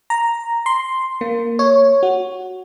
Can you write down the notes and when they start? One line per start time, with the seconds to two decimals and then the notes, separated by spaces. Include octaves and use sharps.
0.10 A#5
0.66 C6
1.21 A#3
1.59 C#5
2.03 F#4